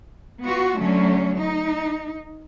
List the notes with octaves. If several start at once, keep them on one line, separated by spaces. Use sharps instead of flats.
B3 F4 F#4
D3 F#3 A3 C#4
D#4